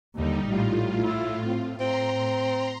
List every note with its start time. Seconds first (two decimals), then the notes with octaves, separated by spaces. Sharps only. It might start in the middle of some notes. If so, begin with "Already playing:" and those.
0.16 D#2 D3 G3 D#4
0.46 A#1 A2 G3 F4
1.03 E4
1.47 C4
1.80 A2 C4 A#5 C6